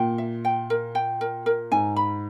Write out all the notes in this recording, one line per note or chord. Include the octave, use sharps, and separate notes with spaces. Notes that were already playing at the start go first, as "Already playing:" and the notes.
Already playing: A#2 G5
E5
G5
A#4
G5
A#4
A#4
G#2 G#5
B5